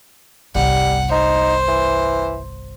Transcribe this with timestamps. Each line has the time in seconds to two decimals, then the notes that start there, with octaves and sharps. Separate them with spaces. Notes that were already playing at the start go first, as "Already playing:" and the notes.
0.55 G1 C2 G3 F#5
1.11 D#4 C5
1.68 E3